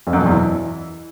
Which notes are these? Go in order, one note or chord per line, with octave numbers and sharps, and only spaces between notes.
F2
F#2
B2
E2
E3